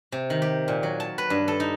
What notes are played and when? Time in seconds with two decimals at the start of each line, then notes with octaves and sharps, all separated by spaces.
0.12 C3
0.30 D#3
0.42 G4
0.68 A#2
0.83 F#3
1.00 A5
1.18 B4
1.30 G2
1.48 A4
1.60 D#4